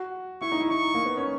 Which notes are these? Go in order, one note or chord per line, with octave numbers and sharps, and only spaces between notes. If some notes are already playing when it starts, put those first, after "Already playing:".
Already playing: F#4
E4 C#6
D#4
E4
D#4 C#6
A#3
B3
C#4